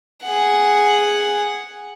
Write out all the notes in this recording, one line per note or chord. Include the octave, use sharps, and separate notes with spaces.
G#4 F#5